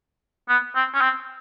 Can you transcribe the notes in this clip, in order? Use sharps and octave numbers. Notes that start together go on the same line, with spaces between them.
B3
C4
C#4
C4